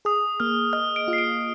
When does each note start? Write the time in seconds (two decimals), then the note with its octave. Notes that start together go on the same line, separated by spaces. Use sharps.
0.05 G#4 D#6
0.40 A#3 F6
0.73 D#5 F6
0.96 D7
1.08 F4
1.13 C7
1.18 D7